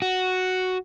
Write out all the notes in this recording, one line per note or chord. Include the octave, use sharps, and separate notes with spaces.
F#4